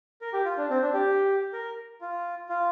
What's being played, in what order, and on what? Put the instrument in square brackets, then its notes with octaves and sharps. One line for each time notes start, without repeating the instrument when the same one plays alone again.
[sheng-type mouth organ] A#4
G4
F4
D4
C4
D4
G4
A#4
F4
F4